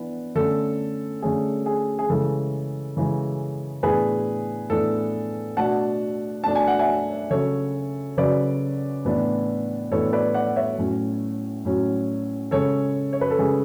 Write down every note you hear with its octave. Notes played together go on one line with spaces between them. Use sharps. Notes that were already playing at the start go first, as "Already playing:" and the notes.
Already playing: E3 B3 D4
D3 A3 C#4 A4
D3 A3 C#4 G#4
G#4
G#4
C#3 E3 G#3 A4
C#3 E3 G#3
A2 E3 B3 D4 G#4 B4
A2 E3 B3 D4 A4
B2 A3 D4 F#5 A5
B2 A3 D4 A5
G#5
F#5
E5 G#5
C#3 F#3 C#4 A4 C#5
C#3 F#3 C#4 B4 D5
A2 E3 B3 D4
A2 E3 B3 D4 A4 C#5
B4 D5
D5 F#5
C#5 E5
A2 F#3 C#4
A2 F#3 C#4
C#3 G#3 C#4 A4 C#5
C#5
B4
A4
C#3 G#3 C#4 G#4